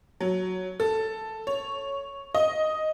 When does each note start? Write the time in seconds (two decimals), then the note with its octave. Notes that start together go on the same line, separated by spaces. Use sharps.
0.21 F#3
0.80 A4
1.47 C#5
2.34 D#5